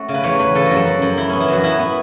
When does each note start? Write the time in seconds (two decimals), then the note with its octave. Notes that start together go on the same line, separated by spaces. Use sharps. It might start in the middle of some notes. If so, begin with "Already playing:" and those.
Already playing: A3 C#4 F#4 A4
0.09 C#3
0.14 B4
0.24 E2 C#5
0.39 E2 B4
0.55 C#3 A4
0.66 F#4
0.71 F#2
0.77 A4
0.86 F#2
1.02 F#2
1.17 E3 E4
1.29 B3 C#4
1.40 E4
1.48 F#2 F#4
1.64 B3 E4
1.79 B3